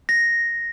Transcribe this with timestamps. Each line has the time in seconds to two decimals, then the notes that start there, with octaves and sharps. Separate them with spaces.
0.09 A#6